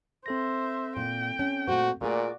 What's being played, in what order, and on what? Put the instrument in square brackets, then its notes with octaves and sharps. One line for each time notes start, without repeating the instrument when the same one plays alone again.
[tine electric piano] C4 A4 A#6 [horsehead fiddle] C5 E5
[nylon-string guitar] A#2 [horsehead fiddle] G5
[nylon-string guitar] C#4
[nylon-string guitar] A#2 A3 C5 [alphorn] F#4
[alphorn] A#2 [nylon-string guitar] A3 F4 G#4 [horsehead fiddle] F#4 D5